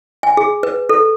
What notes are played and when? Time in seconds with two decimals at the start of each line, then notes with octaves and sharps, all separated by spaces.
0.23 G#5
0.37 G#4
0.63 B4
0.89 A4